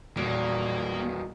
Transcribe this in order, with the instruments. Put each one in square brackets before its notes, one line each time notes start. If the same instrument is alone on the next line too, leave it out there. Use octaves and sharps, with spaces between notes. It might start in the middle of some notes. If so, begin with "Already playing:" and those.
[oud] E2 G3 [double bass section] A#2 [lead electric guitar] D#3 F#3 [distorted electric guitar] A#3